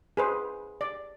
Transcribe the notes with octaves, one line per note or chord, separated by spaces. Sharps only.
G#4 B4 C5
D5